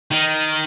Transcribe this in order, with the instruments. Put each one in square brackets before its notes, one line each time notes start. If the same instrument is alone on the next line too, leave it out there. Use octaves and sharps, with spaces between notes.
[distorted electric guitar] D#3